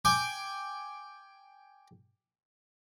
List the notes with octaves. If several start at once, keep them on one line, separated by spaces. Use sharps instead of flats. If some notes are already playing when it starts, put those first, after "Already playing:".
G5 G#5 D6